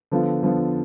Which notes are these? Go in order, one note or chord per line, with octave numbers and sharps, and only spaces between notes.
D3 F3 B3 F4
D3 F3 B3 F4